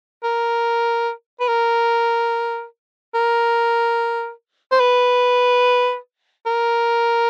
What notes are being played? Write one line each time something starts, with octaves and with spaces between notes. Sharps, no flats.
A#4
B4
A#4
A#4
C5
B4
A#4